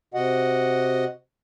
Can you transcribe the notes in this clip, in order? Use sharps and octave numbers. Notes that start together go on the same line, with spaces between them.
C3 F#4 D#5 F#5